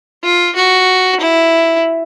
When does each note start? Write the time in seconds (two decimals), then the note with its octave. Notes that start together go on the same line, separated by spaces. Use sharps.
0.23 F4
0.56 F#4
1.20 E4